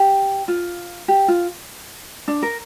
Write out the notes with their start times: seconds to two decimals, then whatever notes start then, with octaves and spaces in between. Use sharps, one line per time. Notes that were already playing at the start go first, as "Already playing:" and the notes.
Already playing: G4
0.48 F4
1.08 G4
1.28 F4
2.28 D4
2.42 A#4